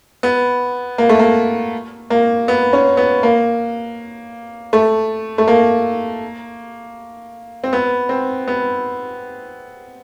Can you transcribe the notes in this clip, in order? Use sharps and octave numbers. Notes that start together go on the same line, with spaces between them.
B3
A#3
A3
A#3
A#3
B3
C#4
B3
A#3
A3
A3
A#3
C4
B3
C4
B3